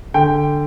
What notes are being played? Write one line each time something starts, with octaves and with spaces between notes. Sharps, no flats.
D3 G5